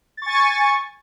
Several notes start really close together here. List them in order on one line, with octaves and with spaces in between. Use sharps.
A6 C#6 G#5